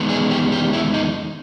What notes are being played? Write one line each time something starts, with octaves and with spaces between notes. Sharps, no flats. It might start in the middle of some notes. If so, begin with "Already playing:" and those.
Already playing: E2 D#3 G#3 B3
G#4
G4
G4
E4
D#4